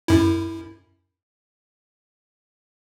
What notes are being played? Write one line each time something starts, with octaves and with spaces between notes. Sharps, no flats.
F#2 E4